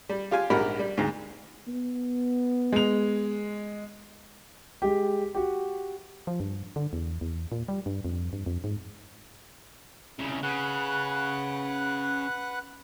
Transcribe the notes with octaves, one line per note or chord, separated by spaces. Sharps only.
G3
F4 G4 F5 G#5
A#1 G#2 G4 A#4 F#5 B5
G3
D2 G#2
B3
G#3 F7
G#3 G4
F#4 G4
F3
G2
D3
E2
E2
A#2
G3
G2
F2
G2
F2
G#2
C2 C#3
C#3 B4 F#5 F#6